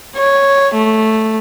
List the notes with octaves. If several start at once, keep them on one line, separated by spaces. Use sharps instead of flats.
C#5
A3